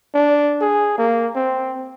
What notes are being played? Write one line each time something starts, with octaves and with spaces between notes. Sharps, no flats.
D4
G#4
A#3
C4